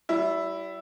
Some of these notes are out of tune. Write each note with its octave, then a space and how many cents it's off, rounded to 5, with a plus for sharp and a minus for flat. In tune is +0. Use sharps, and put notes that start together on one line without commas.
G3 -40 E4 +0